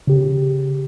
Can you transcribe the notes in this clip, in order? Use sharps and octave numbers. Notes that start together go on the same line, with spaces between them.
C#3 G4